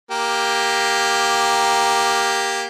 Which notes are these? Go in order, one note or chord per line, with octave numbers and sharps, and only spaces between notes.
A#3 G4